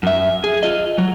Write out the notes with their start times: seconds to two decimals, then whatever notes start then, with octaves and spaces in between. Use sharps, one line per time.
0.03 F#2 E5
0.44 G#4
0.63 F4 D#5
0.98 F#3